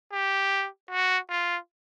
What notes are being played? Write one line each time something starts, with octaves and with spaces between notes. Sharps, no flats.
G4
F#4
F4